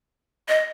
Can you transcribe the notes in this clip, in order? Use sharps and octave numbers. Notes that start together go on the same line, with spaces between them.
D#5